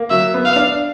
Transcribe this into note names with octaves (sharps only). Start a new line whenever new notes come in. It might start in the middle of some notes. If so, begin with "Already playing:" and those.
Already playing: A#3
F#3 E5
B3
F5
D4